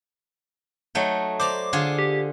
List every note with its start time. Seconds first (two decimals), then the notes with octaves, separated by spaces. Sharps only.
0.95 F#3 A3 D#4
1.40 C5 D5 A#5 D6
1.73 D3 F4 G#4
1.99 G4